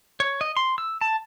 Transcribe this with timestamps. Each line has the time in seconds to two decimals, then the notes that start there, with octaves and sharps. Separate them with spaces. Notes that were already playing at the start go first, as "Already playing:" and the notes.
0.20 C#5
0.41 D#5
0.57 C6
0.78 E6
1.01 A5